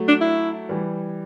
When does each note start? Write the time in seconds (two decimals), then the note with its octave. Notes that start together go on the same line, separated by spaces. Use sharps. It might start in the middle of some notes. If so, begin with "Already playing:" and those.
Already playing: F#3 A3
0.08 D4
0.20 E4
0.69 E3 G3